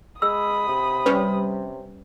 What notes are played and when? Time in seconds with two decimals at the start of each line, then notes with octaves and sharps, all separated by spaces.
0.22 G#3 B5 D#6 E6
0.68 C3
1.06 G3 C#4 B4